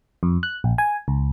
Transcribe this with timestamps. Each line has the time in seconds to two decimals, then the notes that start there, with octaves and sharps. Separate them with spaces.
0.23 F2
0.43 F#6
0.64 A#1
0.78 G#5
1.08 C#2